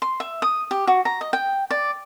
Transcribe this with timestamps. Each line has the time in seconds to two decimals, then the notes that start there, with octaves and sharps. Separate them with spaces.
0.02 C6
0.20 E5
0.42 D#6
0.71 G4
0.87 F#4
1.05 A#5
1.21 D#5
1.33 G5
1.71 D5